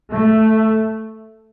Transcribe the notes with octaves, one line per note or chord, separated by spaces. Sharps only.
A3